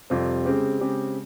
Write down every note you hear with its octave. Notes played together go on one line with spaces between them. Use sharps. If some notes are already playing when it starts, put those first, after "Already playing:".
F2 C3 G3 C4 F4
C#3 G#3 C4 G4
C#3 G#3 C4 G4